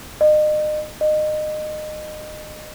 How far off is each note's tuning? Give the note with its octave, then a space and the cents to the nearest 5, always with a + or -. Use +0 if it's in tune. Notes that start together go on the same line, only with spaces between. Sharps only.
D#5 -35
D#5 -25